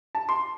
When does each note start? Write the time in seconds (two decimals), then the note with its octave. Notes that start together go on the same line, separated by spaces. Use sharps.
0.15 A5
0.29 C6